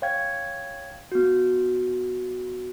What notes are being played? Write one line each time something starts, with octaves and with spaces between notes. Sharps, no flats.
C#5 F5 G5 G#6
B3 F#4